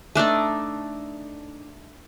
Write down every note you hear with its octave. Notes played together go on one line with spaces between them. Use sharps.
A3 D4 D#4 D5